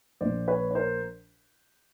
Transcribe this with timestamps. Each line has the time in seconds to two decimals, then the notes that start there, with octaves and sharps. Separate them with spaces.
0.21 A#1 A#2 C5 D5
0.48 B4 C#5
0.71 C#5
0.75 A#4 C5